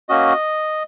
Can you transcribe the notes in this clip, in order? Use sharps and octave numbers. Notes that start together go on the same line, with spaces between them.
A#3 C#4 F#4 D#5